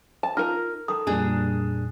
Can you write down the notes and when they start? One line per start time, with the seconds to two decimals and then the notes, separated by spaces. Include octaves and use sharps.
0.23 A5
0.37 D#4 F4 A#4 F6
0.88 D#3 A4 D#6
1.07 F2 A#2 G3 D4 G#4